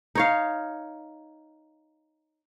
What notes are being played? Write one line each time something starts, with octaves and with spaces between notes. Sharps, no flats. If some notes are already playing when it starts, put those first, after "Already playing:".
D#4 C#5 F5